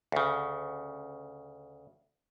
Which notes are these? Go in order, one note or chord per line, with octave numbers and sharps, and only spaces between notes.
D2 C#3